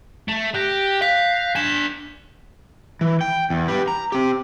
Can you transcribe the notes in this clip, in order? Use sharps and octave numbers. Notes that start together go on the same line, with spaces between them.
A3
G4 F#6 G6 A#6
F5 F#6 B6
D4 G#5 G#6 E7
E3
G5
E2
G4 B4
A#5
C4 G4